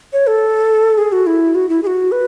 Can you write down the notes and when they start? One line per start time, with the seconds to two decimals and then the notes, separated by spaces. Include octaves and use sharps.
0.13 C#5
0.27 A4
0.98 G#4
1.12 F#4
1.27 E4
1.55 F#4
1.69 E4
1.83 G#4
1.87 F#4
2.12 B4